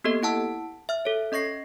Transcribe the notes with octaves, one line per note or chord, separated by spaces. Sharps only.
A#3 B3 G4 A4 D#5
E4 F#5 A5 E6
E5 F6
A4 C#5
C#4 D#5 C#6 A#6 C7